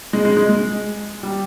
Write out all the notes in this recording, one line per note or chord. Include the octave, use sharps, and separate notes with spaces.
G#3
G#3
G#3
G#3
G3